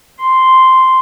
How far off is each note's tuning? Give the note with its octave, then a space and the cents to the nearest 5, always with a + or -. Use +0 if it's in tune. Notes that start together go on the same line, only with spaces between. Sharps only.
C6 -5